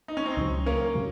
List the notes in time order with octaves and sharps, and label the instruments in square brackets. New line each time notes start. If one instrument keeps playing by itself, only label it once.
[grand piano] D#4
C#4
C4 D#4
[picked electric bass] C#2 C#3 F#3
[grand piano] A#3 C#4
[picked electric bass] C3 F#3